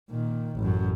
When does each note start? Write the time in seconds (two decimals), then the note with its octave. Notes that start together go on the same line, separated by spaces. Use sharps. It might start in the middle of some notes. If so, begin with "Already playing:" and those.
0.11 A#2 D#3
0.56 A1 F#2